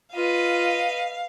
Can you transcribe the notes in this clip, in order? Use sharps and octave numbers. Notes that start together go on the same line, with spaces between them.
F4 B4 D#5 F5